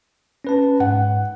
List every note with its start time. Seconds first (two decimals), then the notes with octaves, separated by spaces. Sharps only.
0.44 C#4 B4 A5
0.80 G#2 F#5